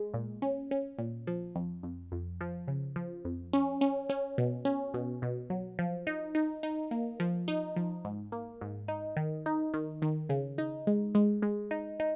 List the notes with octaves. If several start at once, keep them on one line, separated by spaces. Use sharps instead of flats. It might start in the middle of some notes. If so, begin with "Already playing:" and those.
Already playing: G#3
A#2
C#4
C#4
A#2
F3
F2
F2
F2
F3
C#3
F3
F2
C#4
C#4
C#4
B2
C#4
B2
B2
F#3
F3
D#4
D#4
D#4
A#3
F3
D#4
F3
G#2
A#3
G#2
D#4
D#3
D#4
D#3
D#3
C#3
D#4
G#3
G#3
G#3
D#4
D#4